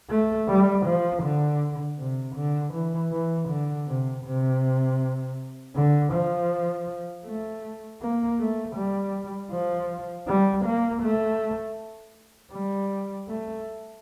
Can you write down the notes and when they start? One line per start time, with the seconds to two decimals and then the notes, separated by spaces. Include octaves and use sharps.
0.09 A3
0.48 G3
0.86 F3
1.23 D3
1.98 C3
2.35 D3
2.73 E3
3.11 E3
3.48 D3
3.87 C3
4.24 C3
5.75 D3
6.13 F3
7.25 A3
8.01 A#3
8.39 A3
8.76 G3
9.51 F3
10.27 G3
10.65 A#3
11.02 A3
12.53 G3
13.28 A3